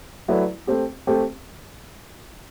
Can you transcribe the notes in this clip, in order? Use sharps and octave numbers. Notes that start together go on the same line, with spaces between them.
F#3 A3 E4 B4 D5
A3 C4 G4
A3 C4 G4